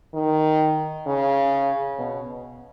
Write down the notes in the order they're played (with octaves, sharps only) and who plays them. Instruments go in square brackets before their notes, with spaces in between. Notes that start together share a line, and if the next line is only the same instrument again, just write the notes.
[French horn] D#3
C#3
B2